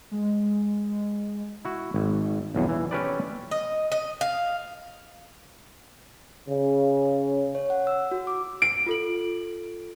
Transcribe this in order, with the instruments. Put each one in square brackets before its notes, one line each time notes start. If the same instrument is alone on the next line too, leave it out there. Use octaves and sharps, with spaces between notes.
[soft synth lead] G#3
[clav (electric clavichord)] E4 F#4
G#1
B1 E2 G2
E3
C#4 G4 A4 B4 C5 D5
[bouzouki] D#5
D#5
F5
[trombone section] C#3
[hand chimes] C#5
F#5
E6
F#4
D6
[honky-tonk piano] D7
[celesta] F4 A4 F#7